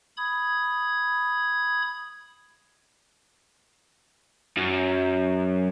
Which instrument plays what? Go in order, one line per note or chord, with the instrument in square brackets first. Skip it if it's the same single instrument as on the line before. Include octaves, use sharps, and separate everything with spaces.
[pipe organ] B5 D#6 G#6
[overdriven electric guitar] F#2